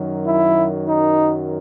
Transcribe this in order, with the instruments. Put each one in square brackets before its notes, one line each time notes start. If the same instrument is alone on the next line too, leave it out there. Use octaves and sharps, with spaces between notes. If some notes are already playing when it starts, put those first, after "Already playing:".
Already playing: [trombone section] F#2 D#3 F#3
E4
D#4